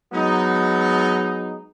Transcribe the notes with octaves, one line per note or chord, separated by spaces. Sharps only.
F#3 G#3 B3 D#4